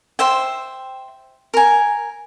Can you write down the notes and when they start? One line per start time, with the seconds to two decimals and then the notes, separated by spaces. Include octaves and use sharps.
0.19 C5 E5 G5
1.54 A#4 G#5